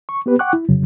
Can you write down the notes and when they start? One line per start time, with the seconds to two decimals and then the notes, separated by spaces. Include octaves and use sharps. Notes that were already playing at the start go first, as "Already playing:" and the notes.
0.09 C#6
0.26 B3 G4 B4
0.39 F#5 G5 C#6 D6 F#6
0.53 E4
0.69 F2 C#3 F#3